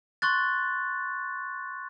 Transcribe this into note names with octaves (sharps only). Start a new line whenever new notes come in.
C6 C#6 F#6 A6